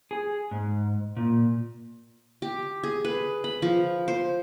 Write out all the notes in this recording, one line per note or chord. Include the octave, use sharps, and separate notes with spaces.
G#4
G#2
A#2
G4
G#4
B4
B5
F3
C5